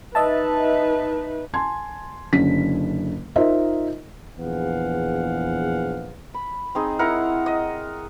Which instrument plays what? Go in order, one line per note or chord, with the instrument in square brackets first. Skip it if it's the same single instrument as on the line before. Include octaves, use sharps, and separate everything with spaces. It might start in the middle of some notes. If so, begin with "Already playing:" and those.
[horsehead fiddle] D#4 B4 [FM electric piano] D#5 E5 A5
[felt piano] G#5 A5 C6 G#6
F#1 D3 C#4 B6
D#4 F4 A#4 C5 D#5 E5
[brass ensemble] A#1 E2 G#4 B4 F5 F#5
[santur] B5
C4 D#4 G#4
E4 A#4 F#5
D#5